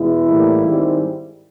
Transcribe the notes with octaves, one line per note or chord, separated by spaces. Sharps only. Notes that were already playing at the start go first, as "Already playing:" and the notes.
Already playing: E2 B2 G#3 E4
A2 E3 G3 A#3
G#2 D#3 G3 C4